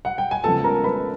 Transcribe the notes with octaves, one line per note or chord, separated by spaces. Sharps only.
F#5
G5
G#5
C#3 F3 G#3 B3 A4 A5
A#4 A#5
B4 B5